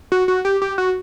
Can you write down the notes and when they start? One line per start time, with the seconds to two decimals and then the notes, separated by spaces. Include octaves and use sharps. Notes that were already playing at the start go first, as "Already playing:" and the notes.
0.12 F#4
0.28 F#4
0.45 G4
0.62 G4
0.78 F#4